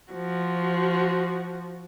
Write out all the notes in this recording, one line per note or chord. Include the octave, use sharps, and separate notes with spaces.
F3 F#4